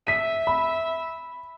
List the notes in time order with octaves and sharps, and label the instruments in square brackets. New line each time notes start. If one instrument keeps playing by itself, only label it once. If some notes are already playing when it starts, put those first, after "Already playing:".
[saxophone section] E5 [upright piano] B6 D#7
[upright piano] B5